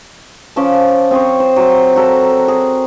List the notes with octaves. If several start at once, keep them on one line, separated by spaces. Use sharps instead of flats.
F3 C#4 A5 D6
C4 G#4 C5 C#5
C5
F#3 C6
F#4 A4 A#4 D5
G#4